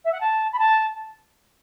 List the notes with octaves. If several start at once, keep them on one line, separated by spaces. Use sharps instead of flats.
E5
F#5
A5
B5
A5